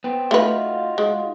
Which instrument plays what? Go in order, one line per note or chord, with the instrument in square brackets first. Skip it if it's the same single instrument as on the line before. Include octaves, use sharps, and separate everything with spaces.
[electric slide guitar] B3 C4
[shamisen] A3 B4 [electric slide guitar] D#4 F4 F#4
[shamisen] G#3